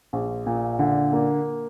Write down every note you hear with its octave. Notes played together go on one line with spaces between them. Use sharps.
A#1
A#2
D3
A#3